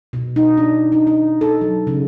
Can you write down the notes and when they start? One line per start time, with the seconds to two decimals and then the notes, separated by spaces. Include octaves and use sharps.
0.13 B2
0.36 D#4
0.57 D4
0.92 D#4
1.07 D#4
1.41 A4
1.61 F#3
1.87 C#3